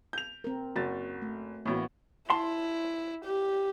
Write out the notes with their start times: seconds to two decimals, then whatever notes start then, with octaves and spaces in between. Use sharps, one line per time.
0.13 G6 F7
0.44 C4 A#4
0.76 F#1 F#4 A6
1.22 A3
1.66 A1 A2 A#3 B3 F#4
2.30 E4 A5 C6
3.25 G4